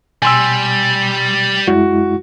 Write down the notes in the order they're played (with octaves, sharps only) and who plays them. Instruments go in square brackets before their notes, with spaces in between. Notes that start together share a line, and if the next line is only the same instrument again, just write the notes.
[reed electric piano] B2 [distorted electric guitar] G3 [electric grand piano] G#5 C6 E6
[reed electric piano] F#2 G#3 E4 [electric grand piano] F#4